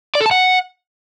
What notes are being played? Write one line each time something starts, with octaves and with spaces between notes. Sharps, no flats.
D5
A4
A5
F#5